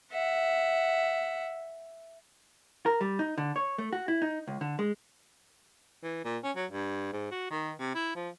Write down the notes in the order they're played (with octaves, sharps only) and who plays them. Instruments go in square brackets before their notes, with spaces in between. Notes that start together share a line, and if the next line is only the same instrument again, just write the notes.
[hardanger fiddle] E5 F#5
[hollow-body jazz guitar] A#4
G3
D#4
D3
C#5
A3
F#4
E4
D#4
C#2
D3
G#3
[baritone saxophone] E3
A#2
C#4
F#3
G2
G#2
F#4
D#3
C3
E4
F3